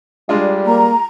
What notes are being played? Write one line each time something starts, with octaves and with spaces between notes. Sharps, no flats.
G3 G#3 D4 F4
A#3 A#5